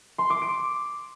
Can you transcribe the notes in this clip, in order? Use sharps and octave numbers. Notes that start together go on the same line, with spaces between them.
C6
D6
D7